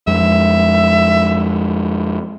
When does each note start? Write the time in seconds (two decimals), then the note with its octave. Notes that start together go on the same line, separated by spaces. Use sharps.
0.07 F2 G#3 E5